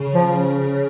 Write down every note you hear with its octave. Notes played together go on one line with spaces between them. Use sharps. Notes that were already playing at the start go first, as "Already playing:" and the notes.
Already playing: C#3
F3